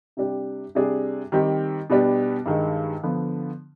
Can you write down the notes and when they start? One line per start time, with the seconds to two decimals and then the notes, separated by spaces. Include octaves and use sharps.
0.17 C3 G3 D4 G4
0.75 C3 G3 D4 G#4
1.32 D#3 G3 C4 G4
1.90 B2 G3 B3 D4 G4
2.46 G2 D#3 G#3
3.03 D3 F3 B3